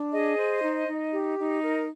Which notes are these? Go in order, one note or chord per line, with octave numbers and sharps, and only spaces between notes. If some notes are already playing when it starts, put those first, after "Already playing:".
Already playing: D4
G#4 D#5
C5
D#4
D#4
G4
D#4
A#4